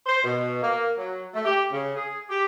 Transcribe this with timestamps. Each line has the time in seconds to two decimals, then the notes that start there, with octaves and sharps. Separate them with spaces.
0.06 C5
0.24 B2
0.62 A#3
0.97 F#3
1.33 A3
1.45 G4
1.73 C#3
1.95 G#4
2.29 G4